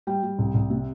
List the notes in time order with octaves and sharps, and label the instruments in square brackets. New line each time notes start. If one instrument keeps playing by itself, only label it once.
[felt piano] G3 G5
G3
C2
C2
C3